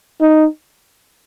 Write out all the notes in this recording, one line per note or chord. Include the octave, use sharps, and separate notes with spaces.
D#4